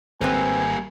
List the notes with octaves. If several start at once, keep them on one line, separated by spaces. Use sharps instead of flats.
G#1 G3 A#3 C4 B4 C5 G#5